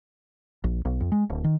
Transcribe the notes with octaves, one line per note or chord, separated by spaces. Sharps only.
A#1
B1
F2
G#3
D1
D#3